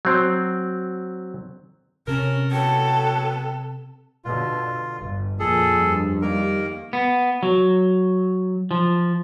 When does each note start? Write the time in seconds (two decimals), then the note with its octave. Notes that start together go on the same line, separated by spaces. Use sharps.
0.05 F#3 C4
2.08 C3 C#4 A4 A#4
2.51 A2 F#3 B3 A4 G5
4.25 B2 D3 F4
4.99 G1
5.39 F2 A#2 G#4 A4
5.78 G2
6.22 D#3 G3 A#3 A#4
6.93 B3
7.43 F#3
8.71 F3